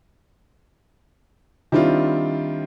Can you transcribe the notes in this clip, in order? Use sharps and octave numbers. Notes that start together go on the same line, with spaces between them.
D#3 G3 C4 D4 E4 F4